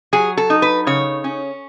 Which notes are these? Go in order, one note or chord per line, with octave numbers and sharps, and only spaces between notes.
F#3 G#4
A4
D#4
B4
C#3 C#5
C#4